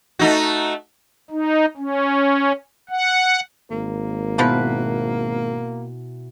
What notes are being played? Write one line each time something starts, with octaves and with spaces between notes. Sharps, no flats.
A3 D#4 F#4
D#4
C#4
F#5
G#1 A#3
B2 F3 E4 F4 B4